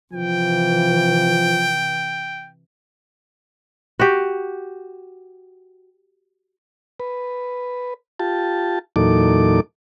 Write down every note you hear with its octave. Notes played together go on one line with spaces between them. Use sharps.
C3 E3 F3 G5
F#4 G4
B4
F4 G4 A5
E2 A#2 F#3 D#4 A4 D6